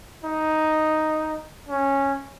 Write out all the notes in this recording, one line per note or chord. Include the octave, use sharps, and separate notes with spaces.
D#4
C#4